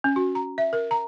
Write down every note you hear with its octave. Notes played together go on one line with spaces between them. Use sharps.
C#4
F#4
A#5
E5
A#4
A#5